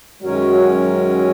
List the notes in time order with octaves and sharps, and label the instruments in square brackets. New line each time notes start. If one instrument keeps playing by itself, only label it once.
[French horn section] F#2 F#3 [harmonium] D#3 G#3 C#4 A#4 C#5